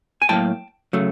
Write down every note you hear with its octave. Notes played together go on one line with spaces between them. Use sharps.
G#5
A2 F#3 A#3 G5 A5
C#3 F#3 A3